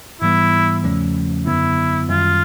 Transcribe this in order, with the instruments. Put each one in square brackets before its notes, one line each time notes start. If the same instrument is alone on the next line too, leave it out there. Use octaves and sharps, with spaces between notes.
[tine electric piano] G#2 E3 G3 B3 [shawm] E4
[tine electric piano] E2 C#3 F3 A3 C#4
[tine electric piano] F#2 D3 F#3 B3 [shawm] E4
[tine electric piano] F#2 D#3 G3 [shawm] F4